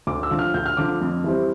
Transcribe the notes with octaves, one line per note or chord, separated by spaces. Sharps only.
D2 D6
E6
D3 F3
F6
D2 G6
F6
D3 F3 D6
F2
E3 G3 C4